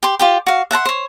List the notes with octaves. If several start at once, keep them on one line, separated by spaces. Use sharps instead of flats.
G4 C6
F4 G4 G5
F#4 F5
E5 F#5 A5 C6
C5 C#5